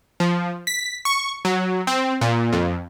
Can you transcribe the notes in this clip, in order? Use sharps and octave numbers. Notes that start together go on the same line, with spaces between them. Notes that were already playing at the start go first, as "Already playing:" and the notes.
F3
B6
C#6
F#3
C4
A#2
F2